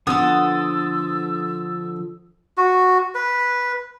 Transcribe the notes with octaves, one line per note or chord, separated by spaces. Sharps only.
D3 F3 B3 A4 D#6 E6
F#4
B4